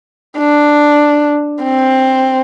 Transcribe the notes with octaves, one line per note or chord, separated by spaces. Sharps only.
D4
C4